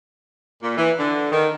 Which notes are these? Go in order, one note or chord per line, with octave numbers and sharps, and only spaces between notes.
A#2
E3
D3
D#3